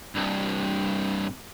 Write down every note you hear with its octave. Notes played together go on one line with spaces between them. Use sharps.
C2 G2